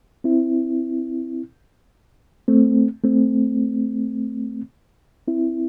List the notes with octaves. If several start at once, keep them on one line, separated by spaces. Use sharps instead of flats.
C4 E4
A3 C4
A3 C4
C4 E4